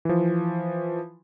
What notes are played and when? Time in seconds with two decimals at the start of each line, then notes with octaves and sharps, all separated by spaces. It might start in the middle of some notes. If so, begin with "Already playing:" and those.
0.05 E3 F3